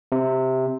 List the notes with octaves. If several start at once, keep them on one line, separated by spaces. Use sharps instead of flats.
C3